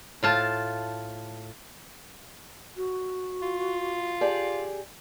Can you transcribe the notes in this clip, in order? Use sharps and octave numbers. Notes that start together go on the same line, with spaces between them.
A2 F4 A5
F#4
F4
G4 G#4 D5